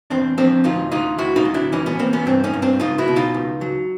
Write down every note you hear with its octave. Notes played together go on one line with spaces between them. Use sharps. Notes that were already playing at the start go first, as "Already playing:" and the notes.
E2 C4 D4
F3 C4 D4
D2 D#4 F4
D3 D#4 F4
D2 E4 F#4
D#4 F4
F#3
D4 E4
E3 C#4 D#4
B3 C#4
E3 A#3 C4
B3 C#4
G2 C4 D4
C#4 D#4
G2
C4 D4
C#2 D#4 F4
E4 F#4
B2
D#4 F4
C#2
F#3